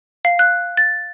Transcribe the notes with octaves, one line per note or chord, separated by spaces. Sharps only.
F5
F#6
A6